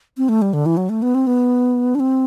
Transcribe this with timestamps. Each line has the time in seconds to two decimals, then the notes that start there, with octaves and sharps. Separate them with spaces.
0.17 C4
0.29 A3
0.42 G3
0.53 D3
0.66 E3
0.77 F#3
0.89 A3
1.02 B3
1.15 C4
1.27 B3
1.95 D4
2.00 C4